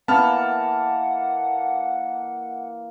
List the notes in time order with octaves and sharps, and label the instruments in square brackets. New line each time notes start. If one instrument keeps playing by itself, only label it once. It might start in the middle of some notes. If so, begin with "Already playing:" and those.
[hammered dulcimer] E3 A#3 [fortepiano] B3 [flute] F#5 [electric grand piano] A5 F6